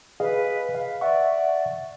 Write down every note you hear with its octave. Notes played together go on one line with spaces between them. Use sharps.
G#4 B4 D#5 F5
F5
D5 E5 F#5 C#6